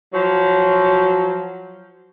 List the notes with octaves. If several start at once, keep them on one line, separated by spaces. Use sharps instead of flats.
F3 F#3